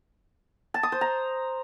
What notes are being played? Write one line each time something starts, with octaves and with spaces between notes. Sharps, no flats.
A5
D#6
C5
A#5